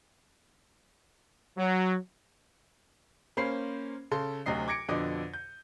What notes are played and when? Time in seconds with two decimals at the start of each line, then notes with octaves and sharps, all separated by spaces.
1.57 F#3
3.37 A#3 C#4 C5 B5 C7
4.11 C#3 A4 C6
4.46 D2 C3 F#3 D#5 C7
4.68 D6 G#6 A#6 C#7 D7
4.89 F2 B2 D3 D#5 D6
5.34 G6